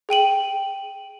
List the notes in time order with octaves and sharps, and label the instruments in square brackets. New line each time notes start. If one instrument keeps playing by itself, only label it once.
[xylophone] G#4 G5 D#7 F#7